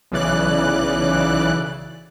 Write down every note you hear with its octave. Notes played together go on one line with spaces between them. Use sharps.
B1 C#3 E3 D5 F#6